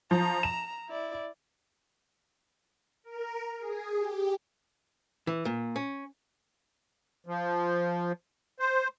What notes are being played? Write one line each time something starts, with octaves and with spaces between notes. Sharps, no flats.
F3 A#5
E7
E4 D5
A#4
G#4
G4
E3
A#2
C#4
F3
C5